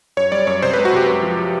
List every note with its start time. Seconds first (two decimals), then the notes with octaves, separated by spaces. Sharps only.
0.17 F#2 C#5
0.32 G3 D5
0.47 F#2 C#5
0.62 C3 C5
0.74 B4
0.78 G#3
0.85 F#4
0.93 C3 G4
1.08 F#2
1.23 F3